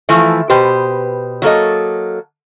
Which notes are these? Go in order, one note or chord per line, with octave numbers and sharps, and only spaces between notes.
E3 F3 A3
B2 G4 B4 C5
F#3 A#3 A4 D#5